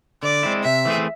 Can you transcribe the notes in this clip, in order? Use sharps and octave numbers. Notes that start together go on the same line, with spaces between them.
D3 D5
G#3 C4 E4
C3 E5
E3 A3 C4 G#4